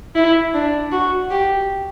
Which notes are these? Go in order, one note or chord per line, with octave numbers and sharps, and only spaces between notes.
E4
D4
F#4
G4